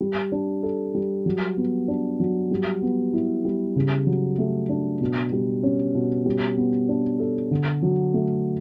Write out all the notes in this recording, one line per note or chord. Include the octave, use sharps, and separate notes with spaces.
G3
D4
A4
G3
F#3
B3
D4
F#3
G3
B3
E4
G3
C#3
F#3
A3
D4
B2
G3
C#4
B2
G3
B3
D4
A4
D3
F#3
A3